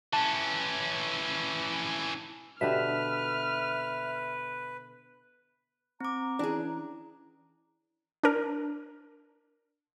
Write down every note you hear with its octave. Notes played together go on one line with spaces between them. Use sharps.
E3 C#4 A5
B2 D3 G4 B4 E5 F6
C4 A#5 D6
E3 C#4 D4 G#4
D4 A#4